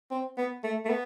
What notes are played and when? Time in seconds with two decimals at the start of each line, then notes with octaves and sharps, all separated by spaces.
0.11 C4
0.38 B3
0.64 A3
0.85 A3
0.90 B3